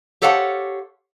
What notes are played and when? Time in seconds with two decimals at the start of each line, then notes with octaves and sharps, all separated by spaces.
0.22 G4 A4 C5 C#5 F5 F#5